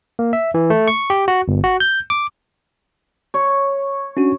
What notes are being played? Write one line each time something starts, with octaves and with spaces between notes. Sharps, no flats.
A#3
E5
E3
A3
C#6
G4
F#4
G1
F#4
G6
D6
C#5
C#4 D4 F#4